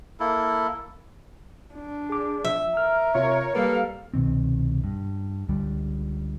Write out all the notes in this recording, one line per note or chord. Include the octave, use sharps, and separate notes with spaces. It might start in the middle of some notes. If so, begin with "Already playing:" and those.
A#3 E4 A4
D4
G#4 D6
F3 E5
A#4 F6
C3 F4 C#5
G3 A#3 A4 B4 F5
C2 B2 D#3 C4
G2
C#2 D3 G3